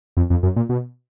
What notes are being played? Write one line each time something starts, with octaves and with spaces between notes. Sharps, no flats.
F2
F2
F#2
A#2
B2